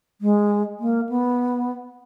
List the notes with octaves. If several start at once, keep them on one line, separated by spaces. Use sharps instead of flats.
G#3
A#3
B3